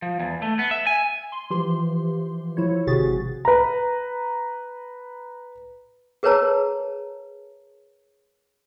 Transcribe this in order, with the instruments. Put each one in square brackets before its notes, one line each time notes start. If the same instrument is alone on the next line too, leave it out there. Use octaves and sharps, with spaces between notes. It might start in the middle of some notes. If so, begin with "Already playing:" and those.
[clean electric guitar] F3
E2
A3
B3
E5
G#5
[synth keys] C6
E3 F3 G4 C6
F3 E4 C#5
G#1 C3 F#4 G#4 A6
[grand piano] B4 A#5
[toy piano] G#4 A#4 B4 C#5 A5 A#5